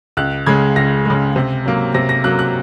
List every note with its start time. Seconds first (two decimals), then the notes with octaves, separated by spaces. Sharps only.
0.17 C#2 F#6
0.47 C#3 G#3 G#6
0.76 C#2 A#6
1.06 C#3 G#3
1.36 C3
1.66 F#3 A#3
1.94 C3 A#6
2.09 A#6
2.24 F#3 A#3 F#6
2.39 F#6